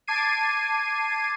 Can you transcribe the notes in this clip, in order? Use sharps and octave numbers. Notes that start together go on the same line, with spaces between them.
A5 D6 G#6 C7 D#7